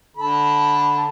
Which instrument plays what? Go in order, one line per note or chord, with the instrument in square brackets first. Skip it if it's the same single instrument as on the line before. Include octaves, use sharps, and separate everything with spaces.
[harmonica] D3 A4 B5